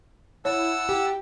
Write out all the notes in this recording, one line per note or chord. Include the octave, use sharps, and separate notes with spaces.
E4 C#5 F#5 A5 E6
G4 G5